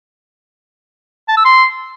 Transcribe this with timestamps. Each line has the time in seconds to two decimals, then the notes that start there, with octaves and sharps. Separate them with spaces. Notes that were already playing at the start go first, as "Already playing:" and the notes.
1.28 A5
1.37 E6
1.45 C6